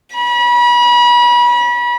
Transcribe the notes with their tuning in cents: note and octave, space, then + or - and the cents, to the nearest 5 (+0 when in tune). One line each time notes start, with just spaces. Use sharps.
B5 -35